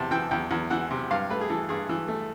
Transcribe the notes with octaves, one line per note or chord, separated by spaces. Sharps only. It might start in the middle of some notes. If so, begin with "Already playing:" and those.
Already playing: E2 C3 A5
E3 G5
E2 G5
E2
E3 F#5
C3
G2 F5
A3 B4
G#4
E3 A4
G2 G#4
E3
A3